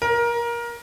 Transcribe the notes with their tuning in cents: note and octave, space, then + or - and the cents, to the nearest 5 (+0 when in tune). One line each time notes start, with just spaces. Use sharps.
A#4 +20